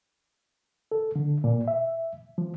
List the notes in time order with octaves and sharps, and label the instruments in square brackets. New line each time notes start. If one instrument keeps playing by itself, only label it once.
[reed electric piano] A4
D3
A#2
E5
F3